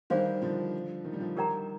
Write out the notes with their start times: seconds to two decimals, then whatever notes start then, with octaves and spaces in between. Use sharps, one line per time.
0.10 D#3 G3 D4 G#4 C5 F5 C6
0.42 D3 F3
1.04 D#3
1.13 G3
1.20 D3 F3
1.37 D#3 G3 G4 A#4 D5 G5 A#5